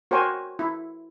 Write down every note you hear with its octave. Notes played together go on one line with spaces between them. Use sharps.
F#4 A#4 C5 C#5 G5 G#5
E4